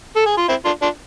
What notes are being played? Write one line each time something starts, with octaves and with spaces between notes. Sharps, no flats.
A4
G#4
F4
C4 E4
D4 F4
D4 F4